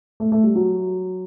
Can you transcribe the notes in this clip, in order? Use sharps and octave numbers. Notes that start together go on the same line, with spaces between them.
A3
A3
G3
F#3